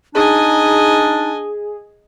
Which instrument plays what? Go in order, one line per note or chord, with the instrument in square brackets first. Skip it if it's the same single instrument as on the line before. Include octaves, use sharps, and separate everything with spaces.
[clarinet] D4 [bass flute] D#4 [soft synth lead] G#4 [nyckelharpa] D#5 G#5